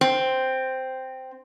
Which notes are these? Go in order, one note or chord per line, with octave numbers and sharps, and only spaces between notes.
C4